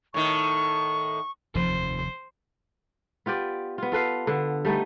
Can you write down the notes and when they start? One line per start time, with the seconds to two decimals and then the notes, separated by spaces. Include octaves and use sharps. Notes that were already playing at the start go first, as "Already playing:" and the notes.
0.14 A2 D#3 C#6
1.55 F1 D#2 F3 C5
3.26 B3 F4 G4 D5
3.78 B3 F4
3.92 F4 A4 B4 F5
4.27 D3 B3
4.65 G3 A3 B3 D#4